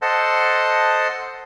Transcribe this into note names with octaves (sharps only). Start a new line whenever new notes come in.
A4 C5 D#5 F#5 A5